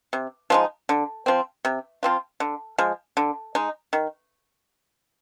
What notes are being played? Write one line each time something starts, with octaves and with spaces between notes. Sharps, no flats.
C3
F3 G#3 D#4
D3
F3 C4
C3
F3 C4 F4
D3
F3 G#3
D3
G#3 D#4
D#3